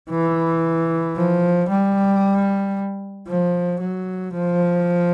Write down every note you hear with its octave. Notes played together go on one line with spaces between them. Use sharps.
E3
F3
G3
F3
F#3
F3